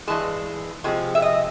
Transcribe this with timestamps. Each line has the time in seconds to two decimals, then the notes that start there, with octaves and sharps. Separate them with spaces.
0.08 G2 E3 G#3 A5
0.84 C3 F3 G#3
1.15 E5
1.22 D#5